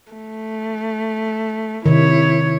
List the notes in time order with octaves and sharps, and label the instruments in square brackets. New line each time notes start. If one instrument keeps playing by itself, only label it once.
[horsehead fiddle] A3
[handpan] C3 D#3 [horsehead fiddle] E4 C#5